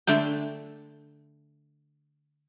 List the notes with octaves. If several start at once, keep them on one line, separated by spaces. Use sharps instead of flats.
D3 A3 D4 G5